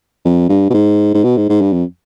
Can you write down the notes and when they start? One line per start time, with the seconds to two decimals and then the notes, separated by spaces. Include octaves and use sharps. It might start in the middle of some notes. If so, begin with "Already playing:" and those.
0.25 F2
0.49 G2
0.70 B2
0.74 G#2
1.14 G#2
1.24 B2
1.37 G#2
1.49 G#2
1.61 G2
1.73 F2